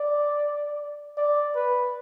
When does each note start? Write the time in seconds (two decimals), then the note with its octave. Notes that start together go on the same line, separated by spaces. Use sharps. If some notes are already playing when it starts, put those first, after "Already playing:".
Already playing: D5
1.17 D5
1.56 B4